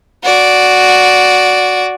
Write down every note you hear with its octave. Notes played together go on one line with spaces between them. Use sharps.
F#4 D5